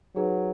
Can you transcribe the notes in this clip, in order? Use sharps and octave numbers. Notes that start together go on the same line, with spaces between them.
F#3 D#4 G#4 B4 F#5